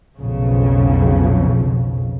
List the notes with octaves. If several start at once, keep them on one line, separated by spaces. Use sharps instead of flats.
B1 F2 C#3